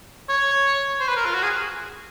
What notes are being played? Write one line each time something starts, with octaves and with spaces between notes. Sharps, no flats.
C#5
C5
B4
A#4
F4
F#4
G#4